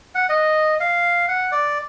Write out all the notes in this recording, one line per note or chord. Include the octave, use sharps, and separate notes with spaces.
F#5
D#5
F5
F#5
D5